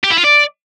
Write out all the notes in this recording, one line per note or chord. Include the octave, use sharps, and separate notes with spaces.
G4
E4
F4
D5